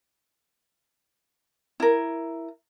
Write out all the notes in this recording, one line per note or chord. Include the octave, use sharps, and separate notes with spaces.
E4 A#4